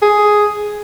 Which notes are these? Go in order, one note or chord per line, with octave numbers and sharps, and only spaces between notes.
G#4